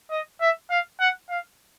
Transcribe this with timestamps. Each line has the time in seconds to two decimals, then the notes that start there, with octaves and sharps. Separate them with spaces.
0.11 D#5
0.41 E5
0.70 F5
1.00 F#5
1.30 F5